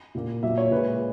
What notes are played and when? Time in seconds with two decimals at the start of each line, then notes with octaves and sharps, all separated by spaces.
0.15 A#2 A#3
0.43 A#2 F#3 A#3 E5
0.58 C#5
0.71 A#2 G#3 B4